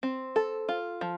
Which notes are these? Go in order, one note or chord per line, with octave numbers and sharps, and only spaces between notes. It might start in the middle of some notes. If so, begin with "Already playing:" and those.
C4
A4
F4
F3